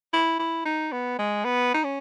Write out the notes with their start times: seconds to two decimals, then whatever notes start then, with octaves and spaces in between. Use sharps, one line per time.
0.13 E4
0.39 E4
0.65 D#4
0.92 B3
1.19 G#3
1.45 B3
1.74 D#4
1.84 C#4